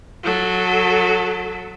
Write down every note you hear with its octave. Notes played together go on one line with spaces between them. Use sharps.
F#3 A4